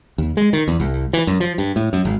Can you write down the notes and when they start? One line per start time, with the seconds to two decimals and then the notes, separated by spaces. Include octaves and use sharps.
0.18 D#2
0.37 G#3
0.53 D#3
0.68 E2
0.80 C2
1.13 E3
1.27 F#2
1.40 F3
1.58 G2
1.76 A2
1.93 F#2
2.05 G#1